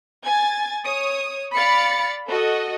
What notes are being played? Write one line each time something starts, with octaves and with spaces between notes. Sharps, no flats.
G#5 G#6 A6
C#5 D#6
D5 F5 B5 A6 C#7
F#4 A4 D#5